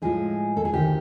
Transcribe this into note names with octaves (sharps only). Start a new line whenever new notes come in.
A2 F3 G#3 G#4
A4
G#4
D2 C3 D#3 G4